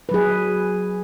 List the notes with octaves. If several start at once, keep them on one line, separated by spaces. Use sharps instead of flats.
F#3 G#4 B4